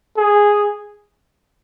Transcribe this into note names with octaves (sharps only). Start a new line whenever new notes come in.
G#4